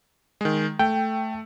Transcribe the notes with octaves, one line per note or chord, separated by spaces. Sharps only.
D#3 G#3
A3 G5